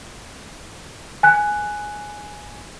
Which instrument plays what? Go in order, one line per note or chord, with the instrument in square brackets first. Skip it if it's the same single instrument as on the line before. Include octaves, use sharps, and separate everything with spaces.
[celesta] G#5 F#6